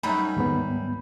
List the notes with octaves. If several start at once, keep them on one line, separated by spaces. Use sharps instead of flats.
F#2 G3 D#4 B5
D#2 G#2 B3